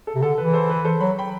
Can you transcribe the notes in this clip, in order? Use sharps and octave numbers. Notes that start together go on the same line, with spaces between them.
A4
C3
D3 A4
E3 B4
A4 C5
B4
A4 C5
F#3 B5
G5 B5